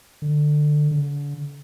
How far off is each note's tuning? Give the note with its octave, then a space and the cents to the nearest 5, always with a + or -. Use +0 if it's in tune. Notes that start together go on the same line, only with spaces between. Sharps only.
D3 +20
D3 -35